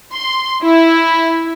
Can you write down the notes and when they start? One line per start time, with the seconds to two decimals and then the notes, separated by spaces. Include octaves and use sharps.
0.13 C6
0.64 E4